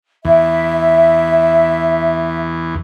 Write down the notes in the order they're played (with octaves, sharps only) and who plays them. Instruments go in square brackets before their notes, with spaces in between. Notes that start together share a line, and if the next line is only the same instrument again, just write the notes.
[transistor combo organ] E2 [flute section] E5